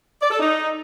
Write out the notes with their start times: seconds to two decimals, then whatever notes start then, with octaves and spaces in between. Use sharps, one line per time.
0.22 D5
0.31 A4
0.40 D#4